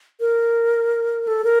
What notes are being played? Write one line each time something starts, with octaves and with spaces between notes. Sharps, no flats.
A#4
A4
A#4